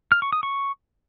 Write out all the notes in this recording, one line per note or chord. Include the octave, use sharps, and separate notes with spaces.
F6
C#6
D#6
C#6